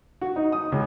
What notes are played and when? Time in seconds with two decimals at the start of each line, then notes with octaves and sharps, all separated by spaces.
0.21 F#4
0.36 D#4
0.52 D#6
0.72 C#2